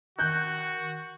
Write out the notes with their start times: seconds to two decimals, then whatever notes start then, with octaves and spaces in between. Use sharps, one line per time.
0.19 D#3 F#4 F#6 G6